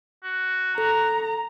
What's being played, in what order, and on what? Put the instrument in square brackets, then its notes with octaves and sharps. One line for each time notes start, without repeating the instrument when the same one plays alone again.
[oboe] F#4
[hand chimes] A4 [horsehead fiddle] A#5